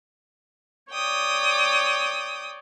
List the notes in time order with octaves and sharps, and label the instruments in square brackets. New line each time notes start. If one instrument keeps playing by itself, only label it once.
[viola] C#5 D5 [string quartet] G5 D#6